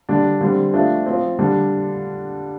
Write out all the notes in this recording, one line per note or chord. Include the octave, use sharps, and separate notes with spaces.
D3 G3 D4
D3 G3 C4
F3 A3 D4
F3 C4
D3 G3 D4